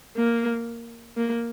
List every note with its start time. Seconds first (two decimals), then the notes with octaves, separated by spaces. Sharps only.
0.17 A#3
1.17 A#3